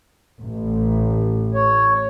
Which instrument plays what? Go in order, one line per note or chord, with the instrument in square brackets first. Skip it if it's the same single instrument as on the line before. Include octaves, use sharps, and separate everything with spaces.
[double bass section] A1
[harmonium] C#5